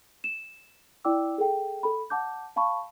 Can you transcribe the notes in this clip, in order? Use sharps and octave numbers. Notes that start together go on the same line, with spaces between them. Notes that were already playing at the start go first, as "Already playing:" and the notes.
E7
E4 D5 G5 D6 E6
G#4 A4 G5
A4 B5
F#5 A5 D6 G6
F5 A5 B5 C#6